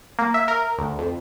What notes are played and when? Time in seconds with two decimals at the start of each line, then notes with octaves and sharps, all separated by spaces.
0.19 A#3
0.34 E5
0.48 A#4
0.78 D2
0.99 F2